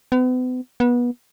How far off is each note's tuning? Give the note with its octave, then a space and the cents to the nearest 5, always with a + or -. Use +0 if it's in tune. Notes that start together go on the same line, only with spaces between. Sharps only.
B3 +40
B3 -25